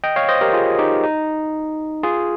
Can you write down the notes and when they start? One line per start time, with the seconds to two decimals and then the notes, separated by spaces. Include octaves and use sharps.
0.04 D#5 G5
0.16 C#5 F5
0.29 C5 D#5
0.41 G4 A#4
0.53 F4 G#4
0.78 D#4 G4
1.03 D#4
2.03 F4 G#4